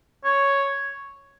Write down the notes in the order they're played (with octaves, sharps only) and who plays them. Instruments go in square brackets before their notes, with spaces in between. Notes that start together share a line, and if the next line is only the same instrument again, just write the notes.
[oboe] C#5